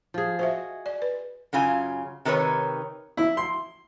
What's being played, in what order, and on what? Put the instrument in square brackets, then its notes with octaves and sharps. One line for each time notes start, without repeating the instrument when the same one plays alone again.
[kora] F3 G#4
[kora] F#4 D#5 [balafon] C5 E5
[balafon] D5
B4
[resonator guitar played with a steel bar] F#2 C#3 F4 G#5
C3 D#3 D#4 B4 C#5
[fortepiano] E4
C6